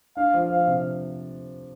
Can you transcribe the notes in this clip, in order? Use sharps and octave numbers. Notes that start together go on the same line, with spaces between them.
D4 F5
F3
F3 F5
C3